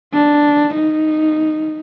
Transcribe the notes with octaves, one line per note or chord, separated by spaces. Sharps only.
D4
D#4